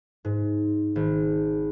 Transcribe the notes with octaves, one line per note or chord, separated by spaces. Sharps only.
G#2
G#1